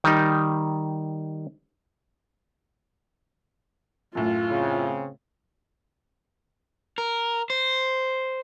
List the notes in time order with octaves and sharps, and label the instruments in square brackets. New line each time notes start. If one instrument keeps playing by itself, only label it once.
[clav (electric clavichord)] D#3 G3 D#4
[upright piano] F#2 A2 [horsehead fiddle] F4
[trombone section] C#3 C4
[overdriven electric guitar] A#4
C5